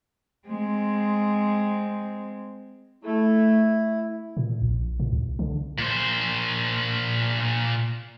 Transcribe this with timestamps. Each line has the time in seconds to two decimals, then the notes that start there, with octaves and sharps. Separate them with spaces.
0.46 G#3 C4
3.04 A3 E4
4.37 A#2
4.62 A#1
5.00 A#2
5.12 C2
5.39 D3
5.78 A#2 C5